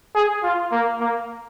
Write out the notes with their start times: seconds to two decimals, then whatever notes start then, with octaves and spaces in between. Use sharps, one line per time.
0.15 G#4
0.43 F4
0.72 A#3
1.00 A#3